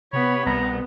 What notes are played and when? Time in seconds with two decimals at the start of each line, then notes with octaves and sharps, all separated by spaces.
0.13 C3 B3 C#5 B5
0.46 C2 B2 B3 A#5